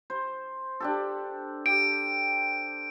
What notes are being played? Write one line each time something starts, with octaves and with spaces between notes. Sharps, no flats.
C5
D4 G4 A4
G4 D7